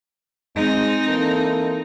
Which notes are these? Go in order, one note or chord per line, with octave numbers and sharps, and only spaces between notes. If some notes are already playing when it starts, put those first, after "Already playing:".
G#3 C4 D#4
E3 A#3 A4